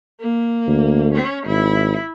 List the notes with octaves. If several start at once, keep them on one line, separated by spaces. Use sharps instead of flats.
A#3
D2
C#4
G#1 E4